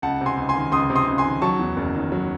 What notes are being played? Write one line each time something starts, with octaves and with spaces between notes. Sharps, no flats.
C#2 F#5 A5
C3
G#5 C6
C#2
G#5 C6
D#3
C#2 C6 D#6
C3
C6 D#6
C#2
G#5 C6
D#3
F#3 A5 C#6
E2
F#1
D#3
F#3